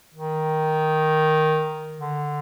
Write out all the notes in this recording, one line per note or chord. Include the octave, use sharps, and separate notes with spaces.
D#3
D3